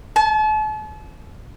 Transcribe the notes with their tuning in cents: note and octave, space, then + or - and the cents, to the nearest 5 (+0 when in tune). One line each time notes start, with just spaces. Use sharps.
A5 -40